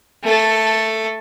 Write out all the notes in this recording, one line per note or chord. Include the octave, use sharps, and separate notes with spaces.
A3 A4